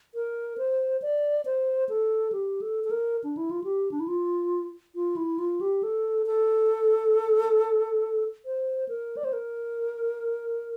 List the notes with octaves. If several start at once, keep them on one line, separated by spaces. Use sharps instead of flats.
A#4
C5
D5
C5
A4
G4
A4
A4
A#4
D4
E4
F4
G4
D4
E4
F4
F4
E4
F4
G4
A4
A4
C5
A#4
D5
C5
A#4